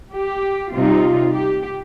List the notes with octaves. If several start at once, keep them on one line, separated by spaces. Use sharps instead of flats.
G4
C3 G3 D#4 F4
G4